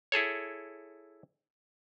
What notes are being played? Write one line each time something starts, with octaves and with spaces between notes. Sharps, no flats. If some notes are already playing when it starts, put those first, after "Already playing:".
E4 G#4 A4 C#5